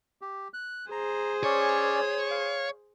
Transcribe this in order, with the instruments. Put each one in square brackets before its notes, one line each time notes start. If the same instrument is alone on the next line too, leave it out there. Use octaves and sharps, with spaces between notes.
[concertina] G4
F#6
[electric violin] G#4 C5 [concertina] A#5
[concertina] C#4 D5 [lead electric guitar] C#5
[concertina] F5